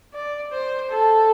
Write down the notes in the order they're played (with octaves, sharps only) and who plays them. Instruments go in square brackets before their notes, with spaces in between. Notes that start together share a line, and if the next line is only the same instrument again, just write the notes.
[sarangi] D5
C5
A4